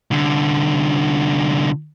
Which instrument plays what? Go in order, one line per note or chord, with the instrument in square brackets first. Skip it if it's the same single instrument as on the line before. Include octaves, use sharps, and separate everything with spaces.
[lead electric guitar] C2 D3